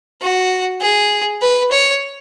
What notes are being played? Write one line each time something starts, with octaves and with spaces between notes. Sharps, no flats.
F#4
G#4
B4
C#5